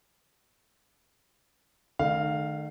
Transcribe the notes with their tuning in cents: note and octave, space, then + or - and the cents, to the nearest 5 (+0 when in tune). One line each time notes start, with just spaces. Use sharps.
D#3 -45 A3 -25 F5 +0